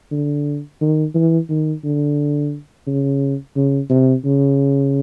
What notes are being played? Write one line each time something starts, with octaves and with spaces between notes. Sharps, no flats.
D3
D#3
E3
D#3
D3
C#3
C#3
C3
C#3